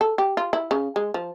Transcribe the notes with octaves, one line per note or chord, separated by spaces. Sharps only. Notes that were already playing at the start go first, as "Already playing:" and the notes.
A4
G4
F4
E4
C#3
G#3
F3